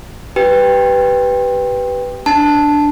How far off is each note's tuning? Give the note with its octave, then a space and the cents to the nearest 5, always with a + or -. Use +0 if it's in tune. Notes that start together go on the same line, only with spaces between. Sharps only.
G4 -20 B4 +0 G5 +20
D4 +0 A5 +0